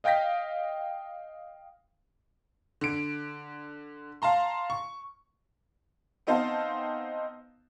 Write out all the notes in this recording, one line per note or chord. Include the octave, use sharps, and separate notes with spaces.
D#5 F5 G5 G6 A#6 B6
D3 D7
F5 A5 A#5 C6
C#6
B3 C4 D#4 C5 F5 A5